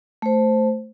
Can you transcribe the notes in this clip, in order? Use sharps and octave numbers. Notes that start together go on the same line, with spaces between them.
A3 C5